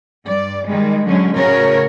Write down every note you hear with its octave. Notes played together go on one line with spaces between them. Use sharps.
G2 D5
D#3 G3 G#3
D3 F#3 G#3 C#4
A2 C#3 F#4 A#4 C#5